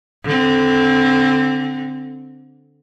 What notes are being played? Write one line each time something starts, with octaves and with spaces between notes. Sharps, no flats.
D3 C4